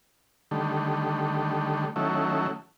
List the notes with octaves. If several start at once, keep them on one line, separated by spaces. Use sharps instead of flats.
D3 D#3 G3 A3
D#3 F#3 A3 C#4 E4